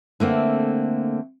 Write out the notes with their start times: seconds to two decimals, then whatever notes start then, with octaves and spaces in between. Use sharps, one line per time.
0.20 D3 A3 A#3 C4